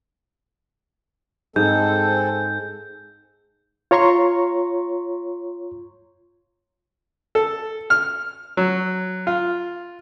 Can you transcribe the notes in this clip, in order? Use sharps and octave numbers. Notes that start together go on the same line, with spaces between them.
G#2 G#3 C4 A4 G6
F4 C#5 A#5 C6 C#6
A4
F6
F#3
F4